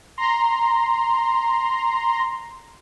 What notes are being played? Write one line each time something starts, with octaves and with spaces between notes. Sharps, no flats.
A#5 C6